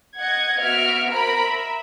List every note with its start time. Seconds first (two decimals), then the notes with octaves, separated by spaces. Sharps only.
0.18 D#5 F#5 G#6 C#7
0.60 B3 F#4 E5 F6 D7
1.12 A#4 C5 A#5 B5 D7
1.45 E5